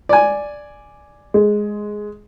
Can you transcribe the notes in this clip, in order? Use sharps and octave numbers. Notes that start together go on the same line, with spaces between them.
D5 G#5
G#3